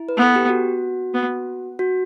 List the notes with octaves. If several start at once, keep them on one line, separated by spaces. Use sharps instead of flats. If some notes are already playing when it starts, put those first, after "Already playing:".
Already playing: E4
B4
B3
A4
G4
F#4
B3
F#4